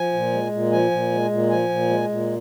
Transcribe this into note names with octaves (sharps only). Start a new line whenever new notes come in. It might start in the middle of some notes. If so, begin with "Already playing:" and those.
Already playing: F3 G#5
A#2
G#3
A#2
F3 G#5
A#2
G#3
A#2
F3 G#5
A#2
G#3
A#2